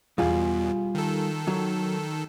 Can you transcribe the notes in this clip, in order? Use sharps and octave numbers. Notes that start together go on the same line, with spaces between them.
E2 B2 G3 F4 G#4
D#3 A4
F#3